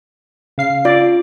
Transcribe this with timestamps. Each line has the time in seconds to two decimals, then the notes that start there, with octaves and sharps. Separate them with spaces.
0.58 C#3 F5 C7
0.85 F4 D5